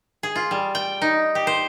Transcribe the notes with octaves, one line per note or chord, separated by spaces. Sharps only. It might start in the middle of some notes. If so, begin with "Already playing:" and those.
G#4
F4
G3
G5
D#4
G4
C5